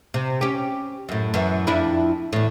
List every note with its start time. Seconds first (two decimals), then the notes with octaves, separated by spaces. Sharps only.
0.14 C3
0.41 C#4 G4
1.09 F#2 A2
1.34 F#2 E3
1.67 F2 D4 E4
2.33 E2 A2